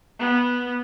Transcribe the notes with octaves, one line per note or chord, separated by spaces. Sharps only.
B3